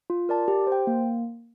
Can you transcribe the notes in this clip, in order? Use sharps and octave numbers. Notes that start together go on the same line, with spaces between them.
F4
A#4 D5 A5
G4
C5
G5
A#3